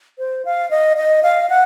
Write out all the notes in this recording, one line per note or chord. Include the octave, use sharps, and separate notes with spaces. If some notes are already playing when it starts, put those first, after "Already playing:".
C5
F5
D#5
D#5
F5
F#5